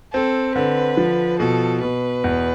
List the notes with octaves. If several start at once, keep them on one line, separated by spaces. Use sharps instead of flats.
C4 A4
D3 B4
F3
B2 A4
B2 B4
E2